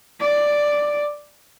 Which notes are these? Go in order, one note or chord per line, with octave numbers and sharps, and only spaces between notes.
D5